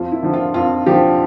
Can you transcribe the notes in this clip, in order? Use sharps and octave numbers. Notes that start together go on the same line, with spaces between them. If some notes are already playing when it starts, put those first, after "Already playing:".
Already playing: F2 F4
E4
D3 F3
F4
F2 F4
D3 F3 G4